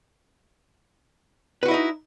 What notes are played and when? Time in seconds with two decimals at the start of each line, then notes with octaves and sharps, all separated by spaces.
1.63 B4
1.65 F#4
1.68 E4
1.71 D#5
1.74 D#4